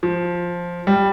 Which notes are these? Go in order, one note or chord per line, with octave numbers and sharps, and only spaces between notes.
F3
G3